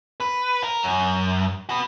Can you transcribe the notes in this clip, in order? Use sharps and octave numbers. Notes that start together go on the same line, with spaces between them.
B4
A#4
F#2
F#4 B4